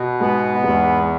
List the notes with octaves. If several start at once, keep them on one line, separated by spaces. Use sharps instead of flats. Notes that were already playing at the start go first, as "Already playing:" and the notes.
Already playing: B2
G#2 G#3 B3
E2 G#2 G#3